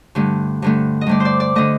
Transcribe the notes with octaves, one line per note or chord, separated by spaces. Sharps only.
G2 D3 A3
G2 D3 A3
D#5
G2 D3 A3 D5
C5 D5
D5
D3 A3 D#5